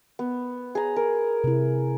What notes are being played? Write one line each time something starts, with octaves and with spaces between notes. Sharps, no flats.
B3
G#4 A#5
A#4
C3 E4